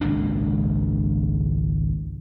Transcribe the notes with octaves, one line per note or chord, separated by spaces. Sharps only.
G#1 C#2 A#2 D4